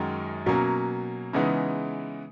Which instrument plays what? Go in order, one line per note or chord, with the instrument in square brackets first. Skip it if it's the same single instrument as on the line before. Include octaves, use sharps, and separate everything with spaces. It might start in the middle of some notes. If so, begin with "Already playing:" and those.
Already playing: [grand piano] F#2 D#3 G#3 D#4 F#4
B2 F#3 A#3 C#4
C#3 E3 G#3 B3 D#4